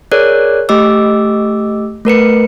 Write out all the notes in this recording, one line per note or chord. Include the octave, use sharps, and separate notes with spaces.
G#4 A#4 C#5 D5 F#6
A3 G4 D#5 D6 E6
A3 A#4 B4 C#7